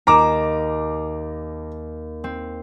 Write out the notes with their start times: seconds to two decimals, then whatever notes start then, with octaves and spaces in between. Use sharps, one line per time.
0.07 D#2 A#5 D6 E7
2.24 C4